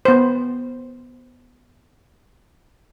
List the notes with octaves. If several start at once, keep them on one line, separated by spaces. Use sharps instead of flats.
B3 C5